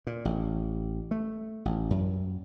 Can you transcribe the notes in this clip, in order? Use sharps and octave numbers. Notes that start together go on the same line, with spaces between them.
A#2
A1
A3
A1
F#2